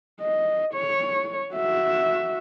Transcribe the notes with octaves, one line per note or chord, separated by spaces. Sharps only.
D#5
C#5
F#4 E5